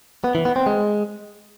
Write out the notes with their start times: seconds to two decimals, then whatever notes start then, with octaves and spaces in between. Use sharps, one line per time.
0.24 B3
0.35 E3
0.45 B3
0.56 C4
0.66 G#3